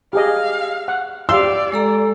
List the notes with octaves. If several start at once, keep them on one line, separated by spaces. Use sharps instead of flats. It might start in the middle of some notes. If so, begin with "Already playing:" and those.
G4 G#4 D#5 F5
F#5
G4 D5 F5 C6 E6
G#3 A4 A#5